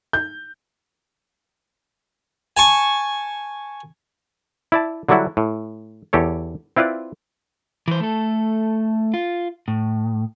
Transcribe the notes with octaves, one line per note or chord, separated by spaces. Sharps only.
G6
G#5 A5 C#6
E4 D5 A5
D3 F#3 G3 D4 E4 F#4
A2
E2 G4 A4 C#5
C4 E4 F4 B4 D5
E3 C5
A3 A4
F4
A2